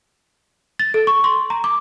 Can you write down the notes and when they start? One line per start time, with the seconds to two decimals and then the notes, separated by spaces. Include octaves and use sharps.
0.79 A6
0.94 A4
1.07 C#6
1.24 C6
1.50 A#5
1.64 D6